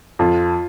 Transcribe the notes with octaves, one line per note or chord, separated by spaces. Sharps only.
F2 F4